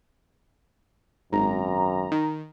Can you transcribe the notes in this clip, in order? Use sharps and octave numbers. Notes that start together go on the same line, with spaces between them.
G#1 F#2 A#5
D#3